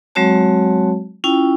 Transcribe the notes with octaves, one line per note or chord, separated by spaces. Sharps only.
F#3 G#3 C4 F#4 C#5 A5
C#4 E4 F4 G5